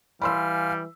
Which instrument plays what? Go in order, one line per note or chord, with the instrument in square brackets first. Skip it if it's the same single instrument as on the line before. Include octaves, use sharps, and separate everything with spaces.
[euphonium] E3 [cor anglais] G3 [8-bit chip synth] F5 G#5 F6 [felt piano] B5 C6 E6